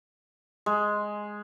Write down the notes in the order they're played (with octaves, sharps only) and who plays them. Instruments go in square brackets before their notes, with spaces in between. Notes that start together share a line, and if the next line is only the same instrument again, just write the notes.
[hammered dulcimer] G#3